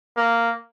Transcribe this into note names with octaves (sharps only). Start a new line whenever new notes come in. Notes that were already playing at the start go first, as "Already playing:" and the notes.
A#3